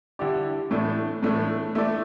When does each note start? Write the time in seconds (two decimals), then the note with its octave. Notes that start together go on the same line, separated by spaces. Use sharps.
0.19 D3 G3 E4 G4 D5
0.71 A2 E3 A3 D4 A4
1.23 A2 E3 A3 D4 A4
1.75 A3 E4 A4 D5